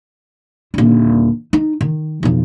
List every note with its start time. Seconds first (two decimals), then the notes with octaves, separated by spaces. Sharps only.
0.74 D#1 D3
1.53 D#4
1.81 D#3
2.23 B1 F2